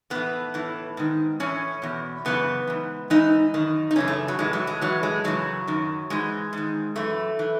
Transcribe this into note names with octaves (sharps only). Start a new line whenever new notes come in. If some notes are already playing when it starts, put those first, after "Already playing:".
A2 E3 B3
A2 E3
G#2 D#3
A2 E3 C#4
E2 B2
F#2 C#3 E3 B3
G#2 E3
G#2 E3 D#4
F#2 D#3
D#4
F#2 C#3 E3 C#4
A3
F#3
A2 E3 G#3
F#3
G#3
A2 E3 F#3
G#3
F#2 C#3 E3 F#3
F#2 D#3
G#2 E3 G#3
G#2 D#3
F#2 E3 A3
E3